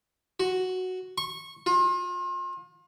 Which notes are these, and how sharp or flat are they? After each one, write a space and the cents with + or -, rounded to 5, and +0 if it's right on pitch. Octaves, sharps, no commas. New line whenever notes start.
F#4 +0
C#6 -20
F4 +35